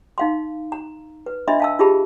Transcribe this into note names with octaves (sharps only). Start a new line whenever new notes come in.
D#4 F5 C6
A#5
B4
D4 D#5 E5 B5 C6
F5 A5 E6
E4 F4 G4 G#4 A5 B5